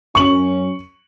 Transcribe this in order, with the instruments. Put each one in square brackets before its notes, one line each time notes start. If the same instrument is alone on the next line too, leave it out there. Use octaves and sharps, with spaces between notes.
[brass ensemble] F#2 C#4 [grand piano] C#6 F#7